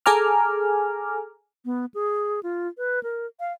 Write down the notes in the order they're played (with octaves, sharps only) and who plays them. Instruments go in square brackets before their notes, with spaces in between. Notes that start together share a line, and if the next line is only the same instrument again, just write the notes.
[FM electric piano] G#4 A4 G#5 A#5 D6 F6
[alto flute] B3
G#4
F4
B4
A#4
F5